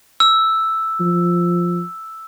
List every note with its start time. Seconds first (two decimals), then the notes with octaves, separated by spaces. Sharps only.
0.20 E6
1.00 F3